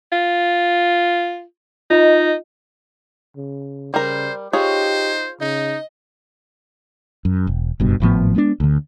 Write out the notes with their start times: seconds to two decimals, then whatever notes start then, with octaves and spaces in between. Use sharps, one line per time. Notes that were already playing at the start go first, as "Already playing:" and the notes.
0.12 F4
1.90 D#4 F4 D#5
3.37 C#3
3.94 C#3 G3 A#4 C5
4.53 D#4 F4 G4 G#4 C5 C#5
5.41 C#3 D#4 D#5
7.25 F#2
7.47 E1
7.80 F#1 G2 B2
8.00 G#1 A2 F3 B3
8.35 G#3 B3 C#4 D4
8.60 D2 D3